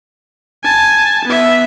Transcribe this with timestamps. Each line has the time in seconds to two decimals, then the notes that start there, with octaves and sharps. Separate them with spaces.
0.63 G#5 A5
1.25 B3 E5